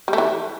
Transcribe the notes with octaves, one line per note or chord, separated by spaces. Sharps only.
G3
A3
E3